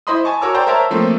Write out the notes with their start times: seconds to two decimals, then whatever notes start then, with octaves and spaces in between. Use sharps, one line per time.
0.07 E4 C5 D#5 B5 C6 D#6
0.25 G#5 A5 C#6
0.42 F#4 A#4 C#5 C#6 D6 E6
0.54 C5 D5 G5 A5 A#5
0.67 A#4 C5 C#5 E5 A5 A#5
0.90 F3 A3 A#3 C4 F4